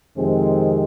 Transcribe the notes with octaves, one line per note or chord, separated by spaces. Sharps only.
F2 C3 D#3 G#3 C4